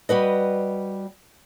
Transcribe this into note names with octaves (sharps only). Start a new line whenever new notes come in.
G3 F#4 B4 D#5